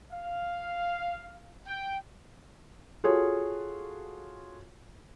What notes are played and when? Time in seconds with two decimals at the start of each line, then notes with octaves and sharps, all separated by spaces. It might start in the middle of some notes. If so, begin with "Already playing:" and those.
0.10 F5
1.66 G5
3.04 F4 F#4 G#4 A4 C#5